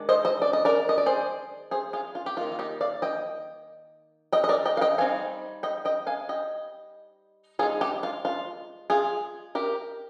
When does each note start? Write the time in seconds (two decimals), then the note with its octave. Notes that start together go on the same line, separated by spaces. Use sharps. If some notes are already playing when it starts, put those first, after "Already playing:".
Already playing: D#3 G#3 D4
0.09 C5 D#5
0.25 C5 D#5
0.42 D5
0.53 D#5
0.65 A#4 D5
0.89 D#5
0.98 D5
1.06 G#4 C5
1.71 G#4 C5
1.93 F4 G#4
2.15 F4
2.26 G4
2.37 D#3 A#3 D#4 F4
2.52 F4
2.59 D#4 G4
2.81 D5 F5
3.02 D#5 G5
4.33 D#5 G5
4.44 D#5
4.49 A#4 D5
4.66 D#5 G5
4.77 F5
4.81 D#5 G5
4.98 G3 C4 D#4 F5 G#5
5.63 D#5 G5
5.85 D#5 G5
6.07 F5 G#5
6.29 D#5 G5
7.59 G#3 F4 G#4
7.63 D#4
7.81 D#4 G4
8.03 F4
8.25 F4
8.90 F4 G#4
9.55 G4 A#4